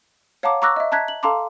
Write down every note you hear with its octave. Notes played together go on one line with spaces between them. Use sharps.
C#5 F5 F#5 A5 A#5 D6
A#5 C#6 D6 E6 F#6 A#6
D#5 E5
A5 A#5 F#6 G#6 B6
F#7
A4 F5 A5 A#5 C6 D6